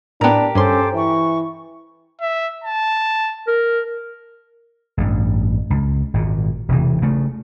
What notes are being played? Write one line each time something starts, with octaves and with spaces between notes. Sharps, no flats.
A2 B3 D4 G4 A#4
G2 C#4 A4 C5 C6 D6
E3 C#6
E5
A5
A#4
A1 G2
C#2
G#1 A#2
E1 C3 E3
C#3 A3